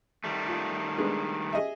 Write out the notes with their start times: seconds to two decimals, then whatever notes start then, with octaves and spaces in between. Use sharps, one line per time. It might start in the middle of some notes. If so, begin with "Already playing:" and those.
0.24 D#3 G3 A3
0.48 F4
0.98 G#3 B3 D4
1.53 G#4 D#5 E5